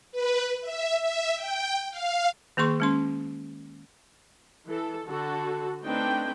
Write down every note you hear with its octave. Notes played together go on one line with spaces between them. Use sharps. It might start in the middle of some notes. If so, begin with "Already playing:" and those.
B4
E5
E5
G5
F5
D#3 A#3 G#4 C6 C#6
G#3 C#4 C6
E3 A4
D3 F#4 A4
A3 C4 D4 D#4 B4 G5